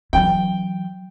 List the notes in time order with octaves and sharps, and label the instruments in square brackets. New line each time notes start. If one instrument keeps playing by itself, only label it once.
[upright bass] E3 F#3 [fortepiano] G5